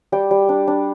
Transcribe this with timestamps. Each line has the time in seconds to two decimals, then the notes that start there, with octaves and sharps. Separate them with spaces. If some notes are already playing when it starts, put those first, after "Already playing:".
0.12 G3 G5
0.31 G3
0.49 D4
0.67 D4